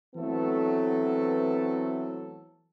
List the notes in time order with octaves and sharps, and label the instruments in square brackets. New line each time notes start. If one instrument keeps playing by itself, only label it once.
[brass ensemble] E3 F#3 A3 B3 C4 A4